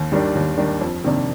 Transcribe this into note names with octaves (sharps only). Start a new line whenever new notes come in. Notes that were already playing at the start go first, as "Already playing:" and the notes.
Already playing: D#2
D#3 G3 D4
D#2
D#3 G3 D4
F2
C3 D#3 A#3 D4